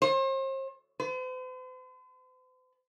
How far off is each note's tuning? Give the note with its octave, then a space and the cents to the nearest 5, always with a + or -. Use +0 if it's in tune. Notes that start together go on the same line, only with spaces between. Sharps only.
C5 +40
C5 -45